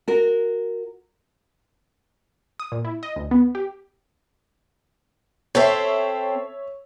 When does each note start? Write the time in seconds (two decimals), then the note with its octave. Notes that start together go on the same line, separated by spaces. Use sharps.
0.08 F#4 A#4
2.60 D#6
2.72 A#2
2.85 E4
3.03 D#5
3.16 D2
3.31 B3
3.55 G4
5.55 C4 A4 C5 C#5 E5